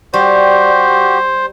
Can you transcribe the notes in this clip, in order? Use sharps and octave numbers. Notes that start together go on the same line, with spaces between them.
G3 F#4 G4 C5